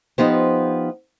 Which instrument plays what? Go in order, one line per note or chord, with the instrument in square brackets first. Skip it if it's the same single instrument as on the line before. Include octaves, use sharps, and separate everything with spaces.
[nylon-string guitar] F3 B3 D#4 G4 C5